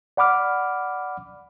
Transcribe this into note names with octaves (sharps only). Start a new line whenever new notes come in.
D5 F#5 B5 D6 F6